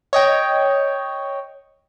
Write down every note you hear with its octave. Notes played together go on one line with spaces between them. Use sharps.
C#5 D#5 G5